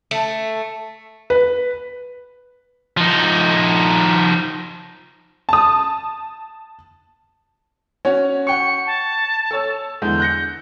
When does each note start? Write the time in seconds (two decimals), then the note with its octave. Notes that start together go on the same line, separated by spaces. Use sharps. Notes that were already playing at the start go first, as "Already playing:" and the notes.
0.11 A3
1.30 B4
2.97 F3 D#4
5.49 A5 D#6
8.05 C#4 F#4 C#5
8.47 F#5 G5 C#6 C#7
8.86 A5
9.51 A4 C#5 E6
10.02 E2 D3 G#3 G6
10.20 F#6 A#6 C#7